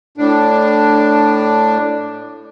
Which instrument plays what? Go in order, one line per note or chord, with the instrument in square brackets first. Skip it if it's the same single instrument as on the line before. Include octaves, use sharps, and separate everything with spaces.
[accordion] A2 D4